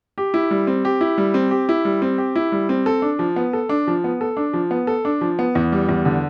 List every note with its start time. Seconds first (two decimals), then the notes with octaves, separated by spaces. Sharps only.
0.18 G4
0.34 E4
0.51 G3
0.67 C4
0.85 G4
1.01 E4
1.18 G3
1.34 C4
1.51 G4
1.69 E4
1.85 G3
2.02 C4
2.18 G4
2.36 E4
2.52 G3
2.69 C4
2.86 A4
3.02 D4
3.19 F3
3.36 B3
3.53 A4
3.69 D4
3.87 F3
4.04 B3
4.21 A4
4.37 D4
4.53 F3
4.71 B3
4.87 A4
5.05 D4
5.21 F3
5.39 B3
5.55 E2
5.72 G3
5.89 E2
6.05 D3